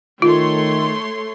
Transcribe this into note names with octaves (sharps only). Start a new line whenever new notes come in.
D#3 A3 F4 C#5 C6